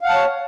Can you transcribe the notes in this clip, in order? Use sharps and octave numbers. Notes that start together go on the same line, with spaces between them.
C#5 F5 F#5 A5